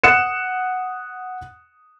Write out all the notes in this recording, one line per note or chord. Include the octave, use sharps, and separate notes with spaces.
F#5 D#6 F#6 C#7 E7